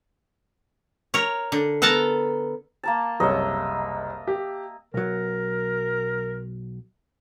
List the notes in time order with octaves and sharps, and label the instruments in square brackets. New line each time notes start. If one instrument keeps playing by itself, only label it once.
[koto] A#4 C#5
D3
B3 A4 A#4 A5 A#5
[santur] A#3 A#4 A5
[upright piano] F#1 C2 C#5 [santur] D#5 E5
[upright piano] G4
[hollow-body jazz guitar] B1 F#3 [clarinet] A#4